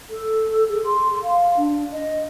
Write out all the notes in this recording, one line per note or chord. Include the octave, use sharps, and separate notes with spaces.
A4
G#4
C6
F5
D4
D#5